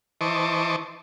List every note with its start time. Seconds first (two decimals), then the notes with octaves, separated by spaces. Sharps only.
0.21 E3 C5 D#5 A5 C#6 D6